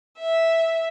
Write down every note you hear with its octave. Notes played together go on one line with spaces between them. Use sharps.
E5